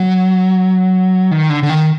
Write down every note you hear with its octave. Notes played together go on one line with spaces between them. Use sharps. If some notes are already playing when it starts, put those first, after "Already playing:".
Already playing: F#3
D#3
D3
D3
D#3